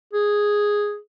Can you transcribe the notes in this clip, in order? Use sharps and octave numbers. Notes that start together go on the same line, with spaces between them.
G#4